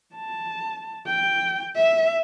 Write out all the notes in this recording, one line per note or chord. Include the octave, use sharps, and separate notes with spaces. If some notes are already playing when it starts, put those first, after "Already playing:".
A5
G5
E5